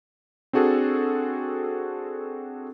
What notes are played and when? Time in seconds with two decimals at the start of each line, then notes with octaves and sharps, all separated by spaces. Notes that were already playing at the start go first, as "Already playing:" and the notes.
0.53 C4 D4 F#4 G#4 A4